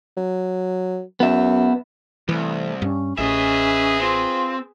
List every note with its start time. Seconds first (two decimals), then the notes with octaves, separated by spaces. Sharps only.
0.17 F#3
1.20 F#2 B3 E5
2.29 C2 E3 A3
2.82 G2 C#4
3.18 A1 C#4 G#4 B4 D#5 E5
4.00 C4 F4